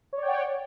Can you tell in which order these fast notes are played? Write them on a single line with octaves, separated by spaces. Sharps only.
C#5 D5 G5 F#5